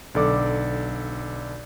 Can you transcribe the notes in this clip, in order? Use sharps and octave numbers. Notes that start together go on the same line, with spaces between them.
B1 D3 A4 D5 D6